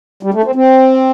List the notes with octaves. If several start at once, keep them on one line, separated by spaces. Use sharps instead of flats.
G3
A3
C4
C4